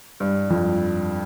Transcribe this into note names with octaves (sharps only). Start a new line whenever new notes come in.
G2
F2